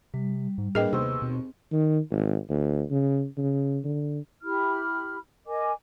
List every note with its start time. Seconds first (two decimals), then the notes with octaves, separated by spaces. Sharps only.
0.14 C3 G3
0.58 G#2
0.75 A2 A#3 D4 G#4 B4 D#5 G5
0.93 D#2 C3 B3 C5 E6
1.22 B2 C4
1.72 D#3
2.11 G#1
2.49 D2
2.91 C#3
3.37 C#3
3.84 D3
4.44 E4 G4 B5 F6
5.47 A#4 D#5 G#5 D6